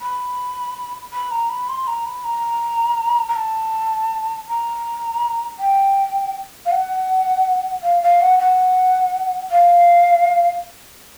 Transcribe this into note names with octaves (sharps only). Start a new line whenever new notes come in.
B5
B5
A#5
B5
C6
A#5
B5
A#5
A#5
A5
A#5
G5
F5
F#5
F5
F5
F#5
F#5
F5